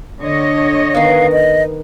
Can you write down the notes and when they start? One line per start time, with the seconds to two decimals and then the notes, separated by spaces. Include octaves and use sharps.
0.22 D3 C#5 D#5
0.95 D#3 B3 F5
1.32 D#5